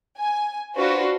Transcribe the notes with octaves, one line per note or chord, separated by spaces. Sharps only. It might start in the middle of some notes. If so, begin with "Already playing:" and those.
G#5
D4 F4 F#4 B4 C5